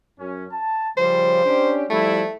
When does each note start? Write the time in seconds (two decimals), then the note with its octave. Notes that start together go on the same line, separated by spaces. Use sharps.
0.20 F#2 C#4
0.52 A5
0.97 C#3 F3 G3 C5
1.45 C#4 D4 G4
1.90 F3 G3 A3 E4